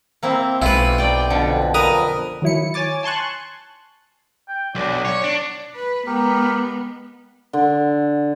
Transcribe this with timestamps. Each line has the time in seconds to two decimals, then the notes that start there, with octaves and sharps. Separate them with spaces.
0.23 A#3 C4 E4
0.62 B1 G#3 E4 F4 B4
0.98 D5 G5
1.30 F2 B2 D3
1.74 A#4 B4 D#6
2.42 D#3 F#3 E4 C#7
2.74 C#5 G#5 D6 A6
3.03 G#5 A5 C6 C#6 F#6
4.48 G5
4.75 B1 D4
5.05 C#5
5.24 D4
5.75 B4
6.06 G#3 B3 G4 A#4
7.53 D3